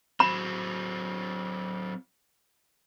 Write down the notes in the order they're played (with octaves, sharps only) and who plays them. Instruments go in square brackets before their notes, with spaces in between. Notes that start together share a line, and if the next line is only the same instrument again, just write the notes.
[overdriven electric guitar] F#3 C4 [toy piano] B5